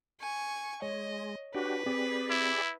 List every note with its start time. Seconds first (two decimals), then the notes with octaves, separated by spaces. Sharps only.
0.20 G#5 C#6
0.82 G#3 C#5 D#5
1.55 D4 F#4 G4 B4
1.86 C4 G4 G#4 D5
2.30 E4